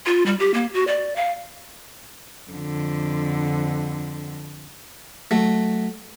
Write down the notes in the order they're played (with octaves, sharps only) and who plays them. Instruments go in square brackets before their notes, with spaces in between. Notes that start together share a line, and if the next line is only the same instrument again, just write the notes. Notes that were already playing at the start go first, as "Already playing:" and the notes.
[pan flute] F4
G3
G4
A#3
F#4
D5
F5
[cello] F2 D3
[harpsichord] F#3 A3